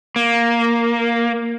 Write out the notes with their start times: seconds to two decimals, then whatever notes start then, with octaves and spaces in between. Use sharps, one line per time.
0.16 A#3